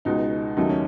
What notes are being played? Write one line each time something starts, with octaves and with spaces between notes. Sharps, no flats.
C#2 B2 G#3 D#4
D#2 C#3 F#3 A3 D#4
C#4